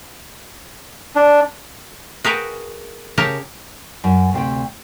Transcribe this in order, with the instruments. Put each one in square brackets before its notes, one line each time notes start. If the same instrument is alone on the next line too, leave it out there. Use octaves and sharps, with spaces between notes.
[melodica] D4
[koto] F#4 G#4 A#4 B4 F5 G5
C#3 G4 A#4 C#5 F5 A5
[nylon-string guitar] F#2
D2 C3 G5